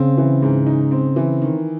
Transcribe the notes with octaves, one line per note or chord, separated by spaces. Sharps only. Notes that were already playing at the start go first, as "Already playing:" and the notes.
Already playing: C#3 C4
E3
G#2
D#4
C4
E3
D#3